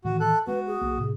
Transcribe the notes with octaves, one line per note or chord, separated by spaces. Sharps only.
A2 D#3 E3 F#4
A4 F#6
G#3 B3 F#4 B4
G#4
B1 A#3
A2 C3